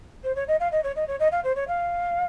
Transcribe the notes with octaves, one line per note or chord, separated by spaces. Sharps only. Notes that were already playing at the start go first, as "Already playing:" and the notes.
C5
C#5
D#5
F5
D#5
C#5
D#5
C#5
D#5
F5
C5
C#5
F5